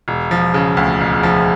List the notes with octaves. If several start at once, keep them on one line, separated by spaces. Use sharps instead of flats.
E1
F3
C#3
D2
E1
F3